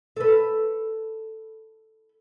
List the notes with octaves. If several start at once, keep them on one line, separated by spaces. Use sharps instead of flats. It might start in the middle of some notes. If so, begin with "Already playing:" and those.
A4 B4